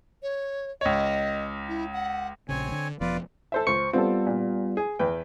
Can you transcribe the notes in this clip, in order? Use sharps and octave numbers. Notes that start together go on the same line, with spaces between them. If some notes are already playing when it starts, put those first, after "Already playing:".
C#5
C#2 C#5 D#5
E4
F#5
A#1 C#3 C4 C#5 G#5
D3
E1 F3 B3 F4 B4 D5
A4 C5 E5
C#2 C5 C#6 C#7
G3 B3 C4 F4 A4
A#2
G#4
E2 B4 G5